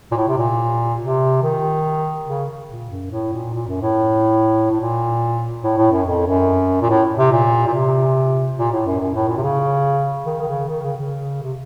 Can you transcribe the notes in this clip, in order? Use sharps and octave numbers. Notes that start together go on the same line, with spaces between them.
A#2
A2
C3
A#2
C3
D#3
C#3
A#2
F#2
A2
A#2
A#2
F#2
A2
A2
A#2
A2
A2
F#2
F2
F#2
A#2
A2
C3
A#2
A#2
C3
A#2
A2
F#2
F#2
A2
A#2
C3
C#3
D#3
D#3
C#3
D#3
C#3
C#3
C3